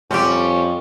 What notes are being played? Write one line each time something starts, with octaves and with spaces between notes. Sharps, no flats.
F2 G3 C4 C#4 G4